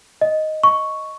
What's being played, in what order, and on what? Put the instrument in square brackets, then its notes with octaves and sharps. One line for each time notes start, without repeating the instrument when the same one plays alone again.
[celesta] D#5
C#6